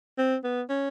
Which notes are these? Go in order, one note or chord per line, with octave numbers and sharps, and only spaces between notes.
C4
B3
C#4